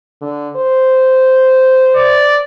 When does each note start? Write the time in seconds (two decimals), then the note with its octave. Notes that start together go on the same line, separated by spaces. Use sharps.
0.21 D3
0.56 C5
1.96 D5